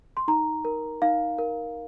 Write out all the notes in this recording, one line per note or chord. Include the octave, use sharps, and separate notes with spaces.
C6
D#4 A#5
A#4
D#4 F5
A#4